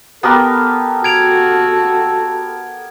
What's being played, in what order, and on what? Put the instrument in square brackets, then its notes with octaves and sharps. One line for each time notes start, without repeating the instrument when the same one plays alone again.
[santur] B3 G4 A#4 [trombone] A4
[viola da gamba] F#4 [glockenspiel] G#6 D7 F7